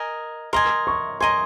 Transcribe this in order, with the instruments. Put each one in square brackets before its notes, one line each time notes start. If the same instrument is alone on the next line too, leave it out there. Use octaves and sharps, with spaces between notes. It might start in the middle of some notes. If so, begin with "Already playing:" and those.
Already playing: [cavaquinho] A#4 D#5 G#5
[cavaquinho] A#4 D#5 G#5 [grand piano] C6
[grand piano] C#6
[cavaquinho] A#4 D#5 G#5 [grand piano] C6